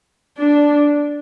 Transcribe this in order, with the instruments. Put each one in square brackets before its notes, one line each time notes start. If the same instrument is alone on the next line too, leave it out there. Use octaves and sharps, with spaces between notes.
[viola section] D4